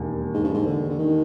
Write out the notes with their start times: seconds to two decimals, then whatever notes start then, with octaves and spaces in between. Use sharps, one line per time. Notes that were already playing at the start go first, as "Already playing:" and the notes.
Already playing: E1 D#2
0.34 G#2
0.44 G2
0.54 G#2
0.66 D3
0.90 D3
0.99 D#3